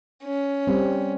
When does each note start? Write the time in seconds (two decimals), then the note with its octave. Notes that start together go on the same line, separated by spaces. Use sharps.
0.24 C#4
0.67 G3 C4